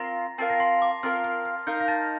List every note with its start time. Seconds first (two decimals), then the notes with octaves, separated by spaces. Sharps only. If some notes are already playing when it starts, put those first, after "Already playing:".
Already playing: C4 F4 A#4 F5 A#5 A#6
0.38 C4 F4 A#4 F5 A5 A6
0.50 A#6
0.60 C6 C7
0.82 D6
1.03 C4 F4 A#4 F5 F6
1.24 F6
1.45 F6
1.67 D#4 A#4 F5 G6
1.80 A#6
1.88 A5 A6